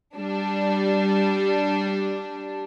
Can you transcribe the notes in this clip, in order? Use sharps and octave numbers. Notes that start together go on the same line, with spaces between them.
G3 D4